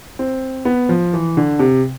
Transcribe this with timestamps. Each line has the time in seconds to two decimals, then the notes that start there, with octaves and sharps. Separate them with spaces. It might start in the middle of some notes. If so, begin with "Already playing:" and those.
0.19 C4
0.65 B3
0.89 F3
1.14 E3
1.37 D3
1.59 C3